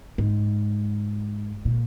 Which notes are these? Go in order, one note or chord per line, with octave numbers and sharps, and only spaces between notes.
G#2
A#2